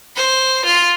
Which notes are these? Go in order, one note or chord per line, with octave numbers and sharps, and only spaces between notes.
C5
F4